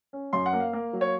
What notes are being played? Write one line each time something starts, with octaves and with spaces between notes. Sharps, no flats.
C#4
F#2 C6
F#5
A#3
F5
A#3
F#3
C#5